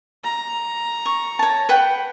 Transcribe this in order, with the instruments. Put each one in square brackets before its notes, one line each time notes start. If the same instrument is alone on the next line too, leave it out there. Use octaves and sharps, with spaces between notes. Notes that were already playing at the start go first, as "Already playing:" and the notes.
[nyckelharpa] A#5
[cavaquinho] C#6
C#5 A5
B4 F#5 G5